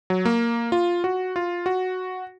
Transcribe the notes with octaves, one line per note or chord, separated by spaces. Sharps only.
F#3
A#3
F4
F#4
F4
F#4